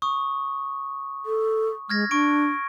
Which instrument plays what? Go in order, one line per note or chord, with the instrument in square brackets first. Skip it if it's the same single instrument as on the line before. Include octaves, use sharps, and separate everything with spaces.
[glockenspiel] C#6 D#6
[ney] A4
[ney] G#3 [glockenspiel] F6 G#6 A#6
[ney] D4 [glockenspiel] C#6 D7